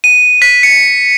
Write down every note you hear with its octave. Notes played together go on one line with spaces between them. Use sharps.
D#7
B6
C#7